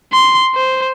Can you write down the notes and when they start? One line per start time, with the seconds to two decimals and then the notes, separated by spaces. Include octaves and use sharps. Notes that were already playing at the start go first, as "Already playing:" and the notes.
0.13 C6
0.56 C5